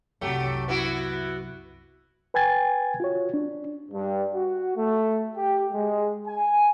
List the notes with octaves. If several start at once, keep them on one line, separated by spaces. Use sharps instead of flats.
C2 F#2 F#3 A3 G4
B3 E4 F#4
B4 G5 G#5 G#6 A6
F4 F#4 C#5
D4
G2
F#4
A3
G4
G#3
G#5